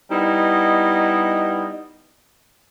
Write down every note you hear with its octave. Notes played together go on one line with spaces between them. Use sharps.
G3 B3 D#4 E4 D#5